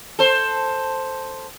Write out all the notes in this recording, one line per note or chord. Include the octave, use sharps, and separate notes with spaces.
A4 C5